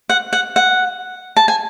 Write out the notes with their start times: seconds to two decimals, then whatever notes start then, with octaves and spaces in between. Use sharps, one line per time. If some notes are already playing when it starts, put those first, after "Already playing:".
0.09 F#5
0.33 F#5
0.56 F#5
1.37 A5
1.48 G#5